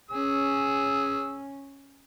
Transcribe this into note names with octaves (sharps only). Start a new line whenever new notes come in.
C#4 G#4 E6